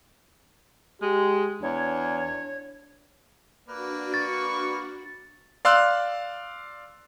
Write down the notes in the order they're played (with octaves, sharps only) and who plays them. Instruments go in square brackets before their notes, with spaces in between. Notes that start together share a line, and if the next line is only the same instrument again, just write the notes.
[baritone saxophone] G#3 [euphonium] G4
[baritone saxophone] E2 [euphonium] D4 [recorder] C#5
[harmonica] A#3 B4 D5 [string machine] D4 F#4
[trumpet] C#6 [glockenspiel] A6
[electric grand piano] D5 F5 C6 E6 F#6